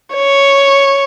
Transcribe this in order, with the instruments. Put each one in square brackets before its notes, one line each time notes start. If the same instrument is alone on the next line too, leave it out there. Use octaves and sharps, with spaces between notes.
[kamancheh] C#5